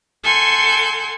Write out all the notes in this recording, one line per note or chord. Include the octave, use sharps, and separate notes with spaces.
A4 F#5 G#5 C6 G6